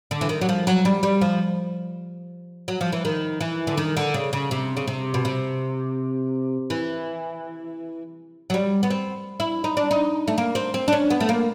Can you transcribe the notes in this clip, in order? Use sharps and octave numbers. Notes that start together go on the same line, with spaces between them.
D3
E3
D#3
F#3
F3
F#3
G3
G3
F3
F#3
F3
E3
D#3
E3
D3
D#3
D3
C#3
C#3
C3
C#3
C3
B2
C3
E3
F#3
G3
B3
C4
E4
D#4
D4
D#4
A3
A#3
C4
C4
D4
C#4
B3
A3
A#3